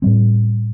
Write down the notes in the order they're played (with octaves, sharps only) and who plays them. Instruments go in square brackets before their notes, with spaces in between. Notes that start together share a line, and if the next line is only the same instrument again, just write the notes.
[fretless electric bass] A2 G3 C4